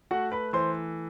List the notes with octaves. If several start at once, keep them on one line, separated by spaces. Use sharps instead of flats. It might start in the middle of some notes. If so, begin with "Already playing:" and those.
A3 F#4 F#5
B4 B5
E3 C5 C6